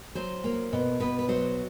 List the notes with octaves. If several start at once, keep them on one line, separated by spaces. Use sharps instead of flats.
F#3 C5
A#3
B2
B2 B4
B4
F#3 C5